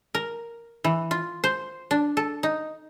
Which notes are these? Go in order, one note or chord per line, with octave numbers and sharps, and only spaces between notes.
A#4
E3
F4
C5
D4
A4
D#4